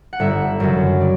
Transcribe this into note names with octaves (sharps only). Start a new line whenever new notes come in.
F#5
G1 E5
F#2 C#3 F#3
D5